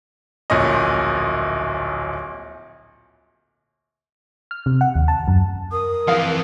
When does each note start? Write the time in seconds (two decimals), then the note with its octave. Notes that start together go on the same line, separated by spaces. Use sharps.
0.50 D1 A#1 A#2 C#4 D#5
4.51 F6
4.66 C3
4.81 F#5
4.95 D#2
5.08 A5
5.28 F#2
5.72 A#4 D#6
6.08 F2 E3 F5